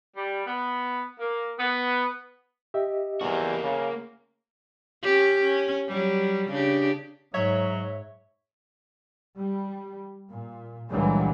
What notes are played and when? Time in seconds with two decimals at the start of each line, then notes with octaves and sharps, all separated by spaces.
0.16 G3
0.46 B3
1.20 A#3
1.58 B3
2.74 G4 D#5 E5
3.21 E2 A#3 F#4
3.63 C#3
5.02 C#4 G4
5.43 C#4
5.88 F#3 G3
6.49 C#3 D4 G4
7.34 G#2 F#3 C#5 E5 C#6
9.39 G3
10.31 A#2
10.90 C#2 A#2 D3 E3 F#3 G3